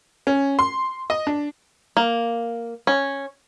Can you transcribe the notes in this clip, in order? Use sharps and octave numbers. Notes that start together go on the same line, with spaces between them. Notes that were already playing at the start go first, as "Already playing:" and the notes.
C#4
C6
D#5
D4
A#3
C#4